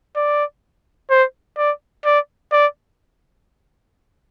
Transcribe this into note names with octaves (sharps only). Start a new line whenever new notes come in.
D5
C5
D5
D5
D5